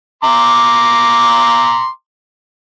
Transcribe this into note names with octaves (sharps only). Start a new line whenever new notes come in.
A#5 C6 D6